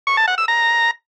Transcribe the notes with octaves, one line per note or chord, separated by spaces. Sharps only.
C#6
A5
F#5
E6
A#5